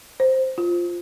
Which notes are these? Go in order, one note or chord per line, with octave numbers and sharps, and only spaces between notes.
C5
F4